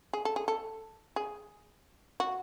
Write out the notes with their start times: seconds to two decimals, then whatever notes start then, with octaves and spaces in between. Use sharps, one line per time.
0.13 G#4
0.25 A4
0.36 G#4
0.48 A4
1.16 G#4
2.20 F#4